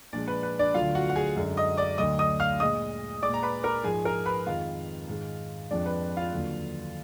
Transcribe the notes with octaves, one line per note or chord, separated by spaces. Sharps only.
A#2 F3 G#3 D4 D5
B4
B4
D4 D5
D2 D3 F#3 F4 F5
F#4 F#5
F#5
G#4 G#5
F#2 D3 G#3
D#5 D#6
D5 D6
D2 D3 F#3 D#5 D#6
D#5 D#6
F5 F6
A#2 G#3 D#5 D#6
A#2 G#3 D5 D6
A#5
B4 B5
A#4 A#5
G#2 F3 G#3 G#4 G#5
A#4 A#5
B4 B5
F2 D#3 G#3 F4 F5
G#2 D#3 G#3
F2 F3 G#3 D4 D5
B4
F4 F5
D#2 D3 F#3